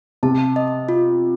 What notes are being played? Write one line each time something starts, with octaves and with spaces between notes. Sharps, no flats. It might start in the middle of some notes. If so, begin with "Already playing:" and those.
C3 A5
D#5
F4